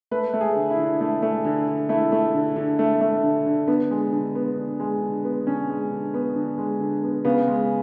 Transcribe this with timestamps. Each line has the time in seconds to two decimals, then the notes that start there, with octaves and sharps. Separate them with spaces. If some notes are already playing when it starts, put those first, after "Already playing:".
0.11 A3 B4
0.34 A3
0.41 G#4
0.56 D3
0.71 E4
0.78 D3
1.01 A3
1.22 A3
1.45 D3
1.68 D3
1.89 A3 E4
2.12 A3
2.35 D3
2.56 D3
2.79 A3
3.01 A3
3.23 D3
3.46 D3
3.68 D3 B3
3.91 G#3
4.13 D3
4.35 B3
4.58 D3
4.80 G#3
5.02 D3
5.24 B3
5.47 D3 C#4
5.69 G#3
5.92 D3
6.14 B3
6.36 D3
6.58 G#3
6.80 D3
7.03 B3
7.25 C#3 B3
7.48 G#3